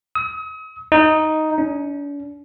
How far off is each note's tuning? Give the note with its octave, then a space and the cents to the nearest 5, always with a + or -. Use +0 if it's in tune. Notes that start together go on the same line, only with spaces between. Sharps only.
D#6 +40
D#4 +5
D4 -45